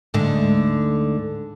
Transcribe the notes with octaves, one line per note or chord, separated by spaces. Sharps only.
D2 G#2 D3